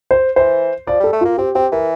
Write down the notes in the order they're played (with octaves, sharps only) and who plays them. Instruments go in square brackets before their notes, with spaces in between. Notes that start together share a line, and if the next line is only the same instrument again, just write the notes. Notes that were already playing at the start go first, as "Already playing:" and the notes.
[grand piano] C5
[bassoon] E3 [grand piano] C5
[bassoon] F3 [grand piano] D5
[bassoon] G3 [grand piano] A4
[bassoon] A3
[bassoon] A#3 [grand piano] F4
[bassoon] C4 [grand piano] G4
[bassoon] C4 [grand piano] G4
[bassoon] E3 [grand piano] A#4